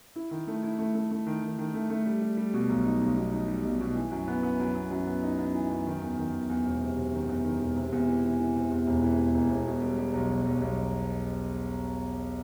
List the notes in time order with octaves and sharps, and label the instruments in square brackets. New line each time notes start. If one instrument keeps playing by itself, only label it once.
[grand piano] E4
D#3
A3
E4
A3
A3
A3
D#3
D#3
D#3
A3
A3
G3
G3
G3
B2
B1
D#4
B1
B2
D#4
G3
B1
B2
E3
F#2
B3
B3
F#2
B3
F#2
B3
D#4
B3
E3
F#2
D#3
E2
D#3
E2
E2
E1
C3
C3
D#3
E2
D#3
E1
C3
E2
E3
E3
E3
C3
E2
E1
E3
E1
E1
E1
B2
G3
G3
B1
B2
B1
B1